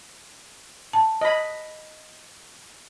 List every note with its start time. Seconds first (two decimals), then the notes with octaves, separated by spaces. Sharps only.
0.93 A5
1.21 D#5 B5